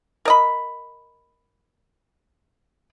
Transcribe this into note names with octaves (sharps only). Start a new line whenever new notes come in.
A#4 D#5 B5